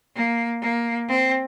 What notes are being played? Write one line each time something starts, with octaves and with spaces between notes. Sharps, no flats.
A#3
A#3
C4